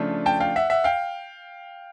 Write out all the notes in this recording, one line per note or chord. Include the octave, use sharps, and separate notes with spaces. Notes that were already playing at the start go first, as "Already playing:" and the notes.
Already playing: C#3 F3 A3 D4 F4
G5 A5
F5 G5
E5 F#5
E5 F#5
F5 G5